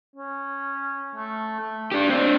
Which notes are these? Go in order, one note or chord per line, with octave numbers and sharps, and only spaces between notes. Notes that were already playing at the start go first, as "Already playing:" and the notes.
C#4
A3
A3
D4 G4 G5
C4 D4